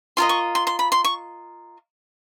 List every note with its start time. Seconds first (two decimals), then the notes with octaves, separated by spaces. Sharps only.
0.17 F4 A#4 D#5 C6
0.29 C#6
0.55 C6
0.67 C6
0.79 B5
0.92 C6
1.04 C#6